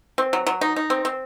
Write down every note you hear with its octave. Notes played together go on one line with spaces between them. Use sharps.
C4
F#3
F#3
D#4
D#4
C4
C4